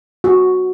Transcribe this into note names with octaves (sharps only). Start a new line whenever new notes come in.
F#4